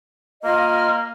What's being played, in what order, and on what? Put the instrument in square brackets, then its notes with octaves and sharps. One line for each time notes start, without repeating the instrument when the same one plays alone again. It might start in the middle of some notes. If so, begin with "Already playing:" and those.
[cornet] A#3 [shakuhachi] F4 [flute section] D#5 F6